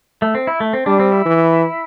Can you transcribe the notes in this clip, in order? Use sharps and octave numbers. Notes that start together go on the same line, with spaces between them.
A3
C4
E4
A3
C4
G3 D4
C4
E4
E3